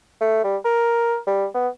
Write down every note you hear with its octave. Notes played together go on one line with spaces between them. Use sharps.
A3
G3
A#4
G3
B3